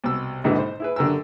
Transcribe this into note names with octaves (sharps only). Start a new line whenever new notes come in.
C2 B2 D6 E6
A#1 E2 G#2 B2 D3 E3
C5
E4 G#4 B4
F#2 D3 G4 A#4 G#5 E6